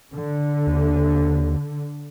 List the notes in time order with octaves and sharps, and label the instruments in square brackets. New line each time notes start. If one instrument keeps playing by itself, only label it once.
[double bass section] D3
[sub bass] D#2